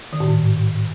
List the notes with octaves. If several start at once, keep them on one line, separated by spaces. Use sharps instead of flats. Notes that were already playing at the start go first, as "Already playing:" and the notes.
D#3
A2
G#2